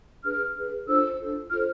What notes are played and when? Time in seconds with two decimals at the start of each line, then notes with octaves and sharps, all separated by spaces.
0.24 D4 G#4 B4 F6
0.56 D4 G#4 B4
0.87 D4 F4 A4 C5 E6
1.19 D4 F4 A4 C5
1.50 F4 A4 C5 F6